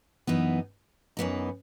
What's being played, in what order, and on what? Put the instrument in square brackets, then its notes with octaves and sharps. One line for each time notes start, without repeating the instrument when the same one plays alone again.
[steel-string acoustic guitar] F#2 E3 B3 D#4
F#2 E3 B3 D#4